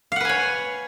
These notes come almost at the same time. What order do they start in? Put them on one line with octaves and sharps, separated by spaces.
F5 F#5 B4 G#5 C#5